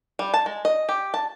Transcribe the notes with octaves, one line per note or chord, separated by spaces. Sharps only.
G3
A5
G#3
D#5
G4
A5